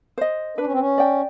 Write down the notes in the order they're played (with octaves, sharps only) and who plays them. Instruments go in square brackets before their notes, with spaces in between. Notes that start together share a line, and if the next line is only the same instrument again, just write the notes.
[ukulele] C5 D#5
[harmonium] D4 [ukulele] B4
[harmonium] C#4
C4
C#4
[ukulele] D5 G5